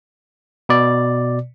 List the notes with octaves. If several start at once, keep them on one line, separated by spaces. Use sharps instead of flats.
B2 D5